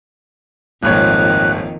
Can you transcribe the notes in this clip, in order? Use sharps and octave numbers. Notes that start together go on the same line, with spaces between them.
D#1 G#1 F2 D#3 C#5 F#6